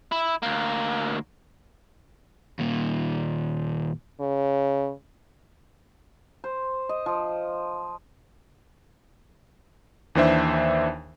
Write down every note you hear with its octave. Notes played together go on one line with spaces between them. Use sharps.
E4
D2 A#3
D#2 A#2
C#3
C5
D#5
F3
D#2 E3 D4 C5 E5